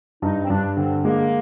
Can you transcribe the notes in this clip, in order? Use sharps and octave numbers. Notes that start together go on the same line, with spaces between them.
G2 D#4
C4
G2 D4
D3 C4
G#3 A#3